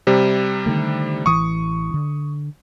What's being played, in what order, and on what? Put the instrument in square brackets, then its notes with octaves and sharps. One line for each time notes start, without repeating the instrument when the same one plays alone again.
[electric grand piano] C3 G3
[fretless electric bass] D3 D#3 A3
[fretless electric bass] A1 E3 [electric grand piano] C#6 D#6
[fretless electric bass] D3